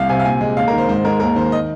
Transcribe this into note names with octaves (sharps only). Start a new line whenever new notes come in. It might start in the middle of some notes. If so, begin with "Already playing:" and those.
Already playing: C2 F5
C3 G#5
F5
A#2 G#5
G#3
D#2 F5
A#4
D#3 C5
G#2 C5
G#3 A#4
D#2 A#4
D#3 C5
D#5